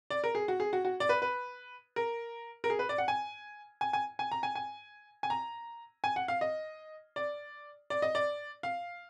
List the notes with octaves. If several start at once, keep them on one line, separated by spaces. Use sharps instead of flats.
D5
A#4
G#4
F#4
G#4
F#4
F#4
D5
B4
B4
A#4
A#4
G#4
B4
D5
F#5
G#5
G#5
G#5
G#5
A#5
G#5
G#5
G#5
A#5
G#5
F#5
F5
D#5
D5
D5
D#5
D5
F5